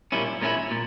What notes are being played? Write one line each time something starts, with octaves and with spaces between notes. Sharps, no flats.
A#2 G3 A#3 C#4 E4
A#2 G#3 C#4 E4
A#2